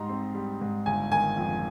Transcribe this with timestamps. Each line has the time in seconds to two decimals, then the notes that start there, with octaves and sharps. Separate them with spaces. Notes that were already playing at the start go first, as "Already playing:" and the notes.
Already playing: G#2 G3 D#4 A#5 C6
0.09 C4
0.35 G3
0.61 G#2
0.86 G1 G#5
1.12 D#3 G#5
1.37 F2